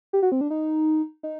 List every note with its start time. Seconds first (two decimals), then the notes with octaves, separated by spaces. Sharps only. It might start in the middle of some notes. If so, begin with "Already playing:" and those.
0.13 G4
0.23 F#4
0.32 C4
0.41 D4
0.50 D#4
1.23 D#4